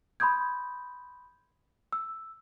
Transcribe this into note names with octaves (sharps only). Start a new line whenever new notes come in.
B5 C6 D#6 G6 G#6
E6